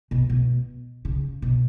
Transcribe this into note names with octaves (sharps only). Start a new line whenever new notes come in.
B2
B2
C#3
B2